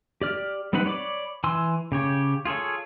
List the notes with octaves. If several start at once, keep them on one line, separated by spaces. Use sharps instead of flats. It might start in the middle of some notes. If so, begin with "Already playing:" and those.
G4 D5 F6
G3 C4 D#4 B4 F#5
C#5 D5 B5 D6
E3 G#5 C6 E6
C#3 G4 C#5
F4 G#4 A4 C#5